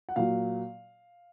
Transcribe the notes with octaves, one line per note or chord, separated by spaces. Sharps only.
F#5
A#2 F#3 F5